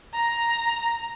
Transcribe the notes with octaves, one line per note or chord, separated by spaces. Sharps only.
A#5